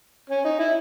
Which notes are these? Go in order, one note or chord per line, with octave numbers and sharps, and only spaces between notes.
C#4
D#4
E4